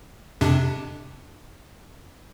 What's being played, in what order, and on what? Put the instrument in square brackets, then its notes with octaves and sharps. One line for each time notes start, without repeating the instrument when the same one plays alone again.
[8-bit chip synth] F2 C3 D4